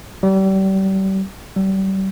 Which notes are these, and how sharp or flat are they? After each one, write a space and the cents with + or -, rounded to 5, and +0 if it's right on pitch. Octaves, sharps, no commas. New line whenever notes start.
G3 -35
G3 -35